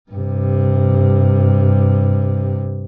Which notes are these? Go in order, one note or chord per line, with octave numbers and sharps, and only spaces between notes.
G2 C3